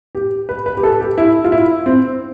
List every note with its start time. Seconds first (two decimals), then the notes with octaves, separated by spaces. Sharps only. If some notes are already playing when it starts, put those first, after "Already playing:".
0.15 G4
0.49 B4
0.66 B4
0.77 G4
0.83 A4
1.00 G4
1.18 E4
1.44 F4
1.52 E4
1.86 C4